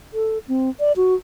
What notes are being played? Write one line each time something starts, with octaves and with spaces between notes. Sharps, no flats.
A4
C4
D5
F#4